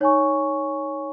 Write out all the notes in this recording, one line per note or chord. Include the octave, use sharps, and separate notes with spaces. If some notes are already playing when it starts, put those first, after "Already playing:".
D#4 C#5 G#5 C#6